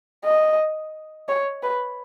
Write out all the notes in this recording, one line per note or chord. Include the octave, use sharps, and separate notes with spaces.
D#5
C#5
B4